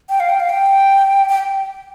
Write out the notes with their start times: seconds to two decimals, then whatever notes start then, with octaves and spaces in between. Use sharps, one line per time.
0.09 G5
0.20 F5
0.29 G5
0.40 F5
0.49 G5
1.29 G5